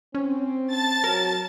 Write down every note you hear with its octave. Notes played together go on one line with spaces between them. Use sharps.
C4 C#4
A5 A6
F#3 A#4